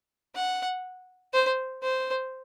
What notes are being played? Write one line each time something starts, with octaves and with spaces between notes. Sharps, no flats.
F#5
C5
C5